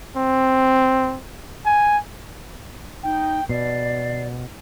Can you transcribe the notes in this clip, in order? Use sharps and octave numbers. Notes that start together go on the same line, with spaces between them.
C4
G#5
D#4 G5
B2 D5 C7